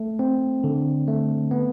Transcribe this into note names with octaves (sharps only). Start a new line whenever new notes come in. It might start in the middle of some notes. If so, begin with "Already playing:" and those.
Already playing: A3
C4
D3
A3
B3